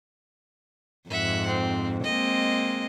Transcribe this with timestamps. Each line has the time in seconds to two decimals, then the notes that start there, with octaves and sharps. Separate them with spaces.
1.09 F2 G#2 E5 F#5
1.47 C4
2.04 G#3 A#3 C4 D#5